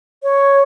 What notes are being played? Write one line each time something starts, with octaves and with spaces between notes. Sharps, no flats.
C#5